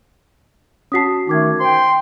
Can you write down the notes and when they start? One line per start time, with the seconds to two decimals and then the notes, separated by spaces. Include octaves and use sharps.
0.92 C#4 F#4 A5 D#6 B6 C7
1.27 D#3 A3 D#4 D6 G#6
1.60 C5 G5 C6